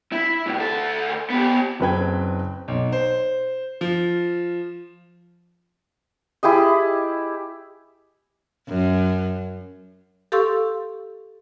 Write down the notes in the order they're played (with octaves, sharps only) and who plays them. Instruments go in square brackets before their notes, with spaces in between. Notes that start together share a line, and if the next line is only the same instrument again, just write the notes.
[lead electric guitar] E4
A2 C3
D2 A4
B3 G4
[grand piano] F#1 C4 B4 G5 G#6
B1
C5
F3
[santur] E4 G4 G#4 D#5
[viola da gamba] F#2
[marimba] G4 A4 F5 C6 C#6 E6